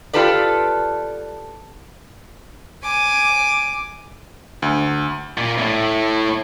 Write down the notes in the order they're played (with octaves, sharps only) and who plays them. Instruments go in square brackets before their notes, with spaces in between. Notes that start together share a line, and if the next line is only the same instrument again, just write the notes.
[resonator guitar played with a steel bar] F4 G4 A4 B4 D5
[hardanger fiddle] G#5 D6
[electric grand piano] D2
[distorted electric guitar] A#2
A2